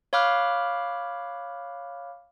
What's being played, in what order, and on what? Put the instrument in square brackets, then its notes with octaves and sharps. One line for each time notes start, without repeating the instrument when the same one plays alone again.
[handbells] C#5 F5 B5 D6 F6 F#6